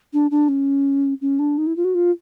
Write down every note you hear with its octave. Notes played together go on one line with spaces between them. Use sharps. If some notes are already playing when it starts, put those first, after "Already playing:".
D4
D4
C#4
C#4
D4
D#4
E4
F4
F#4
F4